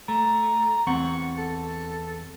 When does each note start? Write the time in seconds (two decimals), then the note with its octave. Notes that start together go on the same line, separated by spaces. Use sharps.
0.08 A3 A#5
0.87 E2 C4 F#5 C#6
1.38 A4